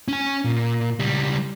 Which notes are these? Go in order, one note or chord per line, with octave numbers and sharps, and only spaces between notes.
C#4 G#5
A#2
C#2 G3